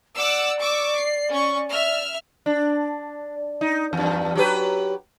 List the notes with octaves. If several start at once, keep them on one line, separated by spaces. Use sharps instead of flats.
D5 F#5 D6 E6
C#6 D6 E6
C7
C#4 C#6
E5 F6
D4
D#4
E2 G2
F#3 G4 B4